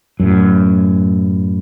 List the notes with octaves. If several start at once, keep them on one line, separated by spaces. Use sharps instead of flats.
F#2 A2